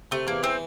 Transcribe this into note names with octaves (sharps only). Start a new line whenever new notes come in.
C3 A3
E2 A#3
E3 C4